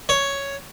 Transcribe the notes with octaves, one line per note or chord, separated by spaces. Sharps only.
C#5